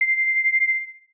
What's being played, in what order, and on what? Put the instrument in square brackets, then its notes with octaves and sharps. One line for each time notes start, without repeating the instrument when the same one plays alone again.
[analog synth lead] C7